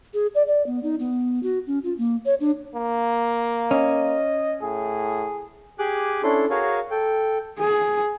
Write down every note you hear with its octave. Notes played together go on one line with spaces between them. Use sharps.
G#4
D5
D5
B3
D#4
B3
F#4
C#4
F4
A#3
C#5
D4
A#3
C#4 D#5
A2 G#4
G4 G#4 G#5 D6 F#6
C#4 D4 E4 A4 C6
F#4 G#4 A#4 C#5 F5 G#5
A4 G5
G#4